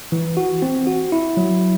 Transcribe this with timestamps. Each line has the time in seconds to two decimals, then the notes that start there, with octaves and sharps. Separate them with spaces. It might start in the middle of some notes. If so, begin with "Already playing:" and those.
0.12 E3
0.37 F#4
0.62 C4
0.87 F#4
1.12 E4
1.37 F#3